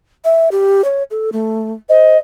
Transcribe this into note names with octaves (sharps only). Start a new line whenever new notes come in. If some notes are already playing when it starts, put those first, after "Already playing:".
E5
G4
C#5
A4
A3
C5 D#5